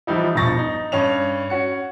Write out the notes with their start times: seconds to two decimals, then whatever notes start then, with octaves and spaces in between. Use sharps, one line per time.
0.07 E3 F3 G3 D#4 E4
0.36 E1 G2 F3 C#6 A6 A#6
0.58 D#4
0.92 G2 C#4 F7
1.50 C#4 F#4 C#7